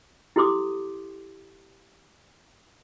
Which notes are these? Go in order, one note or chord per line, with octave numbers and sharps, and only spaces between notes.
E4 G4 A4 C6 D6 D#6